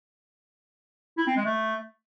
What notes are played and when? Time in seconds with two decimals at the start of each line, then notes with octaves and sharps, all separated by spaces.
1.18 E4
1.27 C4
1.36 G#3
1.46 A3